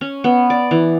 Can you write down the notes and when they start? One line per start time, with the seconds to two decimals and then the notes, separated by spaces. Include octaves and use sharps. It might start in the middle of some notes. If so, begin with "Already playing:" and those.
0.01 C#4
0.24 B3
0.50 D5
0.71 E3